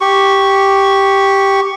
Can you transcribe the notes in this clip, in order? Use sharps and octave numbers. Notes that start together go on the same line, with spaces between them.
G4 C#6